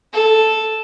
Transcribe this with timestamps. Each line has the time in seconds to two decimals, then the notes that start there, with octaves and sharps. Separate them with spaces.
0.13 A4